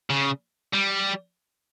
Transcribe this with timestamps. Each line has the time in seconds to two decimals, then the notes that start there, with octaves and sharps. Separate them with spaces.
0.10 C#3
0.74 G3